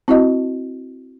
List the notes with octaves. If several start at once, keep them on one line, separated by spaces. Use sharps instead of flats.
C4 E4 F#4 D#5